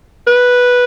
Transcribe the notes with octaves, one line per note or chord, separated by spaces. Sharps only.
B4